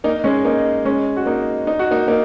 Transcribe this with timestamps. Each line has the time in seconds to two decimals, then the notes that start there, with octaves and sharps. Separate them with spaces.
0.04 A#3 D#4
0.24 G#3 C#4
0.45 A#3 D#4
0.85 G#3 C#4
1.17 F#4
1.26 A#3 D#4
1.67 D#4
1.79 F#4
1.91 A#3 D#4
2.08 A#3 D#4